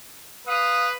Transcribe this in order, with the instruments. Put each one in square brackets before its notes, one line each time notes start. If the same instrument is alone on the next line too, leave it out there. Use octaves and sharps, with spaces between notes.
[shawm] B4 [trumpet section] F5 D#6